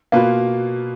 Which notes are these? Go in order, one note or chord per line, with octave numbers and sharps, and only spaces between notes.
B2 A#3 F4 B4